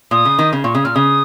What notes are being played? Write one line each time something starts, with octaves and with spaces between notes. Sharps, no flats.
A#2 D#6
C#3
D#3
C#3
A#2 C#6
C#3 D#6
A#2 F6
C#3 D#6